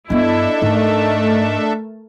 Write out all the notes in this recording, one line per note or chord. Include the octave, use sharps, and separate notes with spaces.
G2 B3 D4 E4 A4 D#5 E5
G#2 A3 A#4 A5